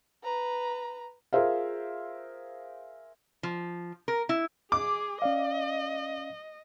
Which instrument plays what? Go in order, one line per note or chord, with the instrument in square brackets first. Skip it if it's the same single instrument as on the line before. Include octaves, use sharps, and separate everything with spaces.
[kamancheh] B4 A#5
[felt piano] F4 G#4 A#4 C5 E5 F5
[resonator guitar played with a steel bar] F3
A#4
E4
[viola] G#4 [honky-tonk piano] D6
[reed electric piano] C#4 D5 F5 [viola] D#5